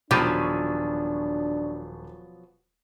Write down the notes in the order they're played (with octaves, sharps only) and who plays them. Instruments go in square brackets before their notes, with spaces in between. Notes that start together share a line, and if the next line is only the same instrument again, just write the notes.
[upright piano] D#1 B5 D#7 [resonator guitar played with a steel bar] B2 F3 F#3 [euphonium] D4 [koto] G4